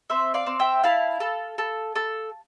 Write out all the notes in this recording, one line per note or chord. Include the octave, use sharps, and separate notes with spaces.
C4 C5 E5
D5 F5
C4
E5 G5
E4 F5 A5
A4
A4
A4